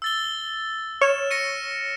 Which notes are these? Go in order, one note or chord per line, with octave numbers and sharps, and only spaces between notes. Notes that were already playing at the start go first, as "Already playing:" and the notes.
E6 A6 G7
C#5 F6 E7
A#6 C#7 D#7